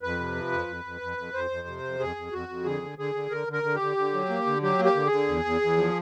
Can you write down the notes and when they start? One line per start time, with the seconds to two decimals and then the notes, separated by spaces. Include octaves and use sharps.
0.02 F2 B4
0.19 C3
0.35 F3
0.52 F2
0.68 F2
0.85 F2
1.01 F2
1.17 F2
1.33 F2 C5
1.50 F2
1.67 C3
1.83 F2
2.00 F2 G#4
2.16 F2
2.32 F2 F#4
2.48 F2
2.65 D3 G#4
2.82 D3
2.98 D3 G#4
3.15 D3
3.31 D3 A#4
3.48 D3
3.53 A#4
3.63 D3
3.75 G4
3.81 D3
3.97 D3
4.14 F#3
4.29 A#3
4.47 D3
4.62 F#3 G4
4.79 A#3
4.85 G4
4.95 D3
5.06 G#4
5.12 D3
5.28 E2
5.45 E2
5.61 E2
5.77 F3